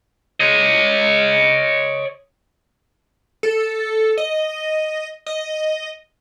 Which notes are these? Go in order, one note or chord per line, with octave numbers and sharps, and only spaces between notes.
C#5 D#5
A4
D#5
D#5